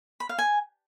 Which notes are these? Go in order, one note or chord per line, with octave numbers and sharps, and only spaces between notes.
B5
F5
G#5